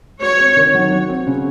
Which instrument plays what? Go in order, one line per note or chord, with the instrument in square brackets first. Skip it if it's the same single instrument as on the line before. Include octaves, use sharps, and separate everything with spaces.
[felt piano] F#4 [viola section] C#5
[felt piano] C4
D#3
F#3
F#4
C4
C#3